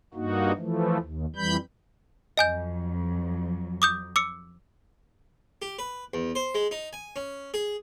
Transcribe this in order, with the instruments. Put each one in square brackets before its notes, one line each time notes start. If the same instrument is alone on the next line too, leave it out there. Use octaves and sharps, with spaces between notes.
[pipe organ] G2 A#3 D#4 F#4
E3 F3 A3
D#2
F2 E3 G3 B5 G6
[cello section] F2 F#3 [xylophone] D#5 G#5 G6
[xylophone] D6 D#6 G6
D6 E6 C#7
[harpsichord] G4
B4
E2
C5
G#3
D#4
G#5
C#4
G#4